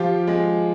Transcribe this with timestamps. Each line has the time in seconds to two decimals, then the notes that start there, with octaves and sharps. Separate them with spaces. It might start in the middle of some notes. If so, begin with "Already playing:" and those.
Already playing: F3 F4 G4
0.27 G#3